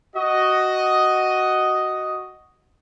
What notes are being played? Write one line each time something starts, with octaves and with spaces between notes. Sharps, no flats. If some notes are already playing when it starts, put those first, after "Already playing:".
F#4 D#5